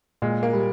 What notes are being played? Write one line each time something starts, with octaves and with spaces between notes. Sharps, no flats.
A#2 G#3
A#3
G3